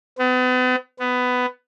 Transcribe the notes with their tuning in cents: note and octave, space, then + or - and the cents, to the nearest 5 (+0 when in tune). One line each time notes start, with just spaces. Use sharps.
B3 +40
B3 +15